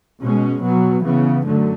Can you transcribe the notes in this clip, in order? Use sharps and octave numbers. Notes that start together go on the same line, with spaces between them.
B2 G#3 C#4
B2 F#3 B3
C#3 E3 B3
F#2 D3 F#3 A3